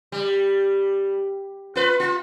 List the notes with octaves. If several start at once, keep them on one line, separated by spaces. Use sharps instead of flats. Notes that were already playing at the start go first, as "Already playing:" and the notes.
G3
F4 B4
F4